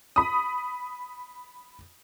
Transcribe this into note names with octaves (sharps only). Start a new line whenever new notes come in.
B5 D#6